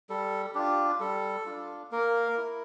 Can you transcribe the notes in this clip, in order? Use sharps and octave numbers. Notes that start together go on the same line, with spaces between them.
G3 A4
D4 F4 G4
G3 A4
D4 F4
A#3 A#4
E4